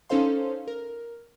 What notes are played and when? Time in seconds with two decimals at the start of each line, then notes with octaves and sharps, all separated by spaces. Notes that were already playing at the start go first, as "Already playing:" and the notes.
0.09 C#4 D#4 A4 C5 F5 C6
0.68 A#4